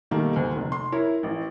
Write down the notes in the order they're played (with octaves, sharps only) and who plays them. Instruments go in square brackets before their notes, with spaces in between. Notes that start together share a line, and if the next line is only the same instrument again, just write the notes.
[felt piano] B2 D#3 G3 A3 A#3
D2
F1
C6
E4 A#4 C#5
A1